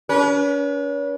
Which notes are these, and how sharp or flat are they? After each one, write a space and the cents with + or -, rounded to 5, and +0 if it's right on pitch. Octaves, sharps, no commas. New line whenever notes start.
C#4 +40 B4 -35